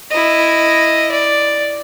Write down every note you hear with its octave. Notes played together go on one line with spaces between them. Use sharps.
E4 D#5
D5